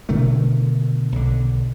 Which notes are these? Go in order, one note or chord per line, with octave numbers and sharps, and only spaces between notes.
B2 D3 D#3 A3
B1 D3